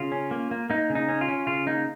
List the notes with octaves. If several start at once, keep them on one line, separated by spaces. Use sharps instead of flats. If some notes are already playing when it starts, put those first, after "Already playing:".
Already playing: C#3 F4
C#4
A#3
A#3
A#3 D#4
C#3
D#4
C#4
F4
C#4
C#3 F4
A#3 D#4